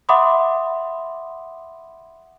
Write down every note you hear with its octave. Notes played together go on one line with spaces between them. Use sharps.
E5 F#5 B5 C6 D6 D#6